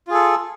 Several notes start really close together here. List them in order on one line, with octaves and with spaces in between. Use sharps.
F4 G#4 A4